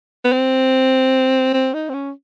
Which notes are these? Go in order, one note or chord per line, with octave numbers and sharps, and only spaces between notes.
B3
C4
C4
D#4
C4
C#4